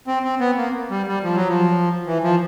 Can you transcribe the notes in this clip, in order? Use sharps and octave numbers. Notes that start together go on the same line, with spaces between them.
C4
C4
B3
A#3
G3
G3
F3
F#3
F3
E3
F3